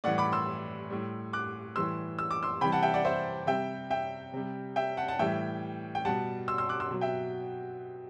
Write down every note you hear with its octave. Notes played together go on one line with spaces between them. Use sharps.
A2 E3 G3 D5 F#5
B5 D6
C6 E6
A2 G3
D6 F#6
A2 E3 G3 C6 E6
E6
D6
C6 E6
C3 E3 G3 G5 B5
F#5 A5
E5 G5
D5 F#5
C5 E5
C3 G3 E5 G5
E5 G5
C3 G3
E5 G5
F#5 A5
F#5 A5
A2 E3 G3 E5 G5
G5
B2 G3 F#5 A5
C6 E6
C6 E6
D6 F#6
C6 E6
B2 F#3
E5 G5